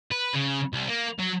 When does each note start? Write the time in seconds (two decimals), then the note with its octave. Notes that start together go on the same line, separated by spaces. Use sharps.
0.11 B4
0.34 C#3
0.73 C2
0.88 A#3
1.19 F#3